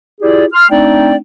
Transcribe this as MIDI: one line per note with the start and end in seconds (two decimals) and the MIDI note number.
0.21 0.45 64
0.21 0.45 65
0.21 0.45 67
0.21 0.45 68
0.21 0.45 74
0.53 0.68 84
0.53 0.68 89
0.70 1.15 57
0.70 1.15 60
0.70 1.15 62
0.70 1.15 63
0.70 1.15 74
0.70 1.15 79